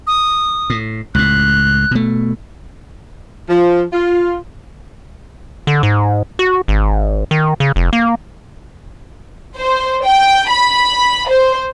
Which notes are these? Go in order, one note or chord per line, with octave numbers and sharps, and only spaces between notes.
D#6
A2
C#2 A2 F#6
B2 A3
F3
F4
D3
G#2
F#4
G#1
D#3
C#3
F1
A#3
C5
G5
B5
C5